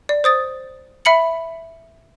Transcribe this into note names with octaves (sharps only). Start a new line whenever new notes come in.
D5
C5 D#6 A6
E5 B5 C#7 F#7